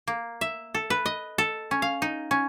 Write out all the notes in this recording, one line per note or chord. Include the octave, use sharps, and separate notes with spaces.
A#3
E5
A4
B4
D#5
A4
C#4
F5
D#4
C#4